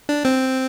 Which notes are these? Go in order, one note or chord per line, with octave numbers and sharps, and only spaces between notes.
D4
C4